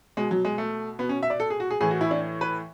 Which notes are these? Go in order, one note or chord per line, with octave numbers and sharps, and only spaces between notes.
B2 G#3
F#3
G#3
A3
B2 B3
C#4
E5
D5
A4
G#4
F#4
G#4
A2 E3 G#4
F#4
E4
D4
B4